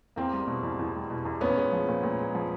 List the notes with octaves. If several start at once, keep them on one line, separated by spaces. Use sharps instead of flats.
E2 A#3 C4
G3
B2
E2
E2
G3
B2
E2
A#2 B3 C#4
G#3
F3
A#2
A#2
G#3
F3